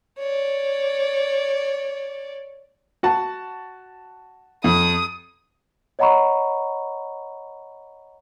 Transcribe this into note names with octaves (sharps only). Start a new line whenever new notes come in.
C#5 D5
F#4 F#5 A5
F2 D#6
C#5 D#5 F#5 A#5 B5 C#6